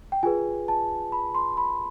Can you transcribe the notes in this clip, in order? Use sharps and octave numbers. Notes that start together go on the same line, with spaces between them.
G5
F4 G#4 B4 G#5
A5
B5
C6
B5